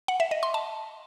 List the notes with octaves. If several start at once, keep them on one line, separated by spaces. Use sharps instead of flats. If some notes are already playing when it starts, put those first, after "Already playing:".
F#5
E5
D#5
C6
A5